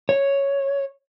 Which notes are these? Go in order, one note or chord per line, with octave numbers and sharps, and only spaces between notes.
C#5